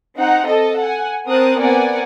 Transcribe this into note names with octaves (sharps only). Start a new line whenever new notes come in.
C4 D#4 F#5 A#5
A4 D#5 A5
F#5 G#5
C4 A#4 C5 A5 D#6 F#6
B3 C4 A#4 D5 F#5 G#5